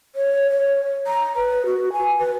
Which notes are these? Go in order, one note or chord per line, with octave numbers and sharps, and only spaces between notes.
C#5
C#5
A#5
B4
F#4
G#5
B4